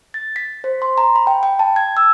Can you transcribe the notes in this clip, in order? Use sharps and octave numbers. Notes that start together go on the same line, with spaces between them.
A6
B6
C5
C6
A#5
B5
G5
G5
A5
G#6
E6